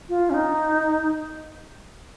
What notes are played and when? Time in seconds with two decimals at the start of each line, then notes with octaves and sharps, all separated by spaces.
0.09 F4
0.30 C#4
0.34 D#4